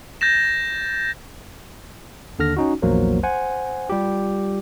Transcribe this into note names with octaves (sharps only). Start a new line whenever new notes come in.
G6 A6 A#6 E7
D#2 D3 A4 F6 A#6
C#4 D#4 F#4
A#1 E2 F#3 A#3 A#4 C5
C5 F#5 G#5
G3 F4 G4